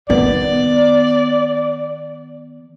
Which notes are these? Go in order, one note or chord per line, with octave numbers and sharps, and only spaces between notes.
D#3 B3 D5